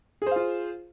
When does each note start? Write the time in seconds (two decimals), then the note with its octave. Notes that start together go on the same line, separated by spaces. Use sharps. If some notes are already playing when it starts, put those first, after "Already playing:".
0.22 G#4
0.26 C5
0.31 F5
0.36 F4